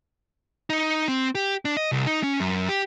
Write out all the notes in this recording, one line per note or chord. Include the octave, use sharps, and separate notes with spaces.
D#4
C4
G4
D4
D#5
C2
D#4
C#4
F#2
G4